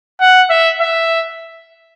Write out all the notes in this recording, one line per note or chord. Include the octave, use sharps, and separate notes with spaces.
F#5
E5
E5